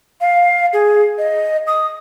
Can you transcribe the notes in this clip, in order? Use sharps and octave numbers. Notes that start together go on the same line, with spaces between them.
F5
G#4
D#5
D#6